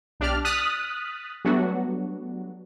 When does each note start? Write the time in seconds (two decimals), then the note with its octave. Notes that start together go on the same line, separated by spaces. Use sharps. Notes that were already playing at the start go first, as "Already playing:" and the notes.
0.20 B1 D4 G4 D5 F6
0.45 D#6 F6 F#6 A6 B6
1.45 F#3 G3 A3 B3 D4 F#4